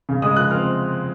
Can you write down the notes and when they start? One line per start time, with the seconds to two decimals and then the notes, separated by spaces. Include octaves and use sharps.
0.09 C#3
0.22 G#3 D#6
0.36 F3 F#6
0.51 C4 F6